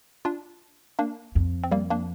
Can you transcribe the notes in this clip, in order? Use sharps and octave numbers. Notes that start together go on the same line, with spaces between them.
D4 F4
A#3 D4
F2
C4
G3 A#3
A#3 D4